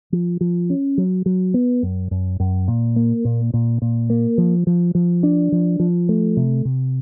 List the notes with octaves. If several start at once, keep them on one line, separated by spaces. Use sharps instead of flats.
F3
F3
C#4
F#3
F#3
B3
F#2
F#2
F#2
A#2
A#3
A#2
A#2
A#2
A#3
F3
F3
F3
D4
F3
F3
A3
C3
C3